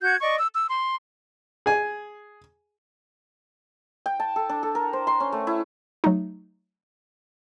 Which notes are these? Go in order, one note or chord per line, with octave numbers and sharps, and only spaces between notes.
F#4 F#5 G6 G#6
D5 D#5 C#6
E6
E6
C6
G#4 G#5
G5
A5
A4
D4
A4
A#4
C5
C6
C#4
A3
E4
F#3 A3 D#4